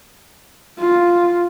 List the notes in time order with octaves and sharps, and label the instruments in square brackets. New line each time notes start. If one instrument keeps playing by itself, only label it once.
[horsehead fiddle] F4